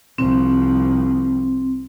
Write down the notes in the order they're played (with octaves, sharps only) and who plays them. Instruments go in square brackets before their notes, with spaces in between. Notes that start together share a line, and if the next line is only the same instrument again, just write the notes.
[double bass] C2 F3 [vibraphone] C4